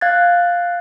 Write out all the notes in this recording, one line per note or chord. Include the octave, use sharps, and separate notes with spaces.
F5 F#6 G#6 A6